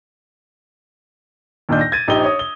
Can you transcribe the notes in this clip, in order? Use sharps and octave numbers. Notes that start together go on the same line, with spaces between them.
D#2 A#2 D4 D#5 G6
A#6
G#6 A6 D#7
A#1 D#4 G4 C5 E6 G7
C#5 D#6
G7